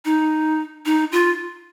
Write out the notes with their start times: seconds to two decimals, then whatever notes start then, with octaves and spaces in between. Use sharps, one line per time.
0.05 D#4
0.85 D#4
1.12 F4